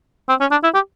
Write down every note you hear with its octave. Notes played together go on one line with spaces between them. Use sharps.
C4
C#4
D4
E4
G4